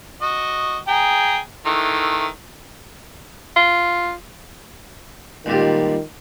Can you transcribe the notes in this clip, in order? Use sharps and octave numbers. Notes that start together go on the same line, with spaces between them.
F#4 D#5
G#4 G5 A#5
D#3 E3 A3
F4
C#2 A#2 D#3 G3